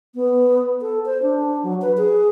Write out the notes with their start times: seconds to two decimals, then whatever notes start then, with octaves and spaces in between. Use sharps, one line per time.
0.15 B3
0.82 A4
1.06 C5
1.22 D4
1.63 F#3
1.82 B4
1.97 G#4